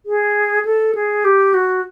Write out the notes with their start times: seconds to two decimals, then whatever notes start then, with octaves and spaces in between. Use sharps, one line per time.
0.06 G#4
0.65 A4
0.95 G#4
1.25 G4
1.54 F#4